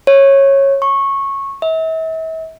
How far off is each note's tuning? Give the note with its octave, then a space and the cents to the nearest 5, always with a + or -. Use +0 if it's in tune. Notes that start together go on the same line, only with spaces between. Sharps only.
C#5 -15
C#6 -15
E5 -40